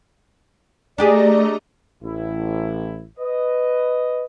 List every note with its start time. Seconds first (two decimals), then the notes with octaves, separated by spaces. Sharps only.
0.98 A3 D4 G4 G#4 D5 D#5 A#5
2.03 A1 E4
3.20 B4 D#5